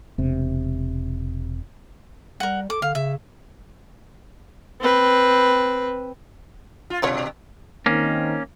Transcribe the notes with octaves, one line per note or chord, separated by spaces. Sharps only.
E1 C3
G3 A#4 F#5
A4 D6
D3 F5
C#3 E5
C4 B4
F4
G2 B2 F#3 F4 C#5
D#3 A#3 C4 C#4